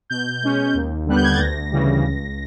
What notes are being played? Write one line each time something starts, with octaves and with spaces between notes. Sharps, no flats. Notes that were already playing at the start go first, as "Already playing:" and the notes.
B2 G6
G#3 C#4
D#2
D3 G3 B3 F#6
G6
G#6
A6
D2 A#6
C#3 E3 G3
C#2